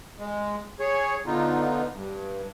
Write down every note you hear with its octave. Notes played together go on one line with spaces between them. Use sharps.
G#3
G#4 C#5
D3 B3 D#4 F4
G2